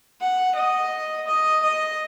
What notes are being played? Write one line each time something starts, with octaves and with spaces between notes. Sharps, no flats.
F#5
D#5
D#5
D#5